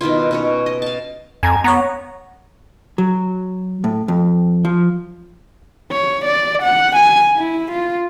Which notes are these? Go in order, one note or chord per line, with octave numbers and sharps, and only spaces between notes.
B2 D#3 E4 F4
B2 C#4 C#5
D#5
F5 A5
F2 G#5 A#5 G#6
B3 C#5 F#5 A#5
F#3
A2
F2
F3
C#5
D5
F#5
G#5
E4
F4